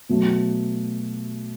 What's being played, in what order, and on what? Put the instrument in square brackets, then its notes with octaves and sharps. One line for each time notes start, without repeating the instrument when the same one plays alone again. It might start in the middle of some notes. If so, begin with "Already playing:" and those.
[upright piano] B2 F#3 A3